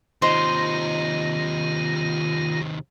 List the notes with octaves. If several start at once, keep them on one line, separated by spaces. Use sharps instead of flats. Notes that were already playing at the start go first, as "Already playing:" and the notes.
D#2 C3 D#3 D#4 F4 C5